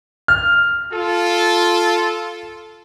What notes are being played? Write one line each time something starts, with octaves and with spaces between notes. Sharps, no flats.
F6
F4 A4